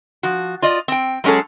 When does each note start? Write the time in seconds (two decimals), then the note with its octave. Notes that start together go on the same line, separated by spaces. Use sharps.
0.23 F3 F#4
0.62 F4 D5 D#5
0.88 C4 G5
1.24 F#3 G#3 C#4 G#4 A4